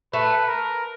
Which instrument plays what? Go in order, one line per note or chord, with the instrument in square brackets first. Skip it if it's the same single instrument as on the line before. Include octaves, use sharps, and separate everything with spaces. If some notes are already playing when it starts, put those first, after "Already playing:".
[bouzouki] A3 [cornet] B4
[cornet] A#4